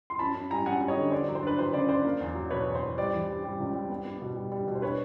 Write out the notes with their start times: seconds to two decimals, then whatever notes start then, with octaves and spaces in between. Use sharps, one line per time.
0.10 C6
0.19 F#2 A5 B5
0.35 F#2
0.51 G3 G#5 A#5
0.66 F#2 F#5 G#5
0.81 G3
0.88 C#5 D#5
0.97 D3
1.11 D4 C5 D5
1.28 F#3
1.35 C5
1.43 D4 B4
1.58 F#3 C5
1.73 C#3 C5 D5
1.89 D4 C5 D5
2.05 A#3
2.21 E2
2.35 F#3
2.51 B2 B4 C#5
2.66 E2
2.75 C5
2.83 E2
2.98 G3 C5 D5
3.13 E3
3.28 G3
3.44 G3
3.60 C#2
3.75 G3
3.89 B3
4.05 B3
4.22 B2
4.36 G3
4.52 G3
4.67 B2
4.75 C5
4.82 D4 B4 C#5